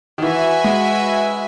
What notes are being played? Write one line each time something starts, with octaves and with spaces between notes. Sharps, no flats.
D#3
E3 F#4 B4 E5 G#5
G#3